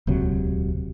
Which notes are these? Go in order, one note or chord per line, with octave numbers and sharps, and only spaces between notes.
D#1 C#2 C3 F#3